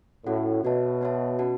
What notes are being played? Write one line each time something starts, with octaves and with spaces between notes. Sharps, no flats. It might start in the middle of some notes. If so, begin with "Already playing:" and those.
A2 A3 C#4 F#4 A4 F#5
B2 B3 F#4 C#5 E5 A5
B3 F#4 C#5 E5 A5
C#4 F#4 B4 F#5 A5